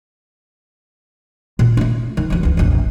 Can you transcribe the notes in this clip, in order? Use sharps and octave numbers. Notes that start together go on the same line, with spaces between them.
A#2
A3 F4
D#3
F3 F#3
D2 E3
F1 A#1